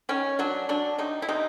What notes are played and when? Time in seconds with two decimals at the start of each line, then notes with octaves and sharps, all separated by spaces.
0.09 D#3 C#4
0.39 F#3 D4
0.69 F#3 D4
0.98 C3 D#4
1.22 E4
1.29 C3 D#4